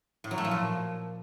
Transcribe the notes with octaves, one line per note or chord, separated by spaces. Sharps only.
A2
F#3
A3
F3
A#2